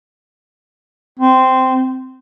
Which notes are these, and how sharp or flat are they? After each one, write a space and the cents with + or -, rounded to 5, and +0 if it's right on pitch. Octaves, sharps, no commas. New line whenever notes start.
C4 -10